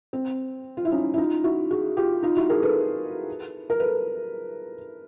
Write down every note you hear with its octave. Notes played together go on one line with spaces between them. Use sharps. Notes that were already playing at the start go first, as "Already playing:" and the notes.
C4
F4
E4
C#4 D#4
E4
D#4 F4
E4 F#4
F#4 G#4
F4 G4
D#4 F4
E4 F#4
G#4 A#4
A4 B4
A#4
A4 B4